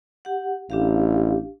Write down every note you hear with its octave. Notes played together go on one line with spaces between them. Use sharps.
G4 F#5
A1 D4 G4 F5